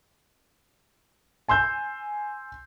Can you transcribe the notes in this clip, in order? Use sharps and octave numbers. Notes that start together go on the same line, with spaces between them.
G#5 C6 E6 G6